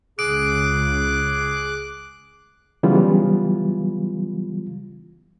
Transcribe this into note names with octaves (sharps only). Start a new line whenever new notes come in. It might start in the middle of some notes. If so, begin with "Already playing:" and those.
C#2 C#3 G#4 D6 F#6 D7
C#3 E3 F#3 G3 B3 F4